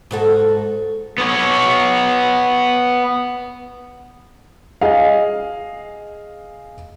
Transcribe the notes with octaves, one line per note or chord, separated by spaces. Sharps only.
G#2 F#4 A4
B3 C#5
G#4 D#5 F5